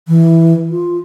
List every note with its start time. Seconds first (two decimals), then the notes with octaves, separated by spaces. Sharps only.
0.08 E3
0.71 F4